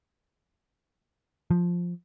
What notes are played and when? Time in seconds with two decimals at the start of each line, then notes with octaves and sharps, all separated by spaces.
1.51 F3